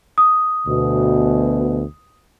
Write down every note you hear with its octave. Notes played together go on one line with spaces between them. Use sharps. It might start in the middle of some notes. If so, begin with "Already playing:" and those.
D#6
D2 B2